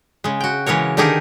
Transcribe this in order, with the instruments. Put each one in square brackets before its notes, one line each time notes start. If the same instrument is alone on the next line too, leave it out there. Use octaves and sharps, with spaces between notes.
[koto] C#3 G#3
F#4 G5
C#3 E3 G#3 A#4 C#5
D3 D#3 D#4 G4 G#4 A#4